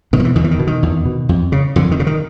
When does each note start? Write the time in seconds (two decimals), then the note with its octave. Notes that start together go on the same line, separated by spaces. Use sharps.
0.13 B2 D#3
0.20 F3
0.25 E3
0.36 E2 D#3
0.44 E3
0.51 D#3
0.59 B2
0.67 D#3
0.83 E2
1.05 B2
1.29 F2
1.52 C#3
1.76 F2 D3
1.91 D#3
2.00 C#3
2.07 D#3